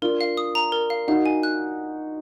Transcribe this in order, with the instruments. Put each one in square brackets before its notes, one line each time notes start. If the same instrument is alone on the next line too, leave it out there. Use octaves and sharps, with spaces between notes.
[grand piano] D4 F4 [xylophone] A#4
[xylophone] F5
D#6
A#5
A#4
F5
[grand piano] D#4 F#4 [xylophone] F5
[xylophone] G#5
F#6